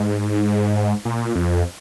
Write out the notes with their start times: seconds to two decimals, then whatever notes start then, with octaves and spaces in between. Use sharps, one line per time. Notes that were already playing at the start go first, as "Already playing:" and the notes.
Already playing: G#2
1.05 A#2
1.35 F2